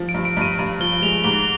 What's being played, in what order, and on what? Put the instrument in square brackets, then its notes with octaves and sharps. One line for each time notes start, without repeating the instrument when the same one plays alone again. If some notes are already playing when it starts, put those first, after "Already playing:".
Already playing: [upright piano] F3
[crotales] D7
[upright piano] G2
[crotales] D7
[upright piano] G2 [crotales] D#7
[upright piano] G2 [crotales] D#7
[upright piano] F3 [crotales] G7
[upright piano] G#3 [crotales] F7
[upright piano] G#2 [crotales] G7